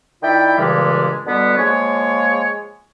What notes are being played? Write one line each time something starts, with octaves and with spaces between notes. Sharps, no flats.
D#3 E4 F4 D5 G5 B5
G2 A#2 C#3 E3 G3 G#3
B2 D3 G3 B3
F3 G#3 A#3 C#5